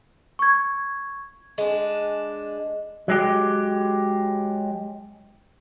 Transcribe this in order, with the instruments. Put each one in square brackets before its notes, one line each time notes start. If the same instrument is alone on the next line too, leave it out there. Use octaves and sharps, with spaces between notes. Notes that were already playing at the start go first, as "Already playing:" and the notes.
[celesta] C#6 G#6
[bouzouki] G#3 D4
[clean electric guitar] F#3 G#3 G4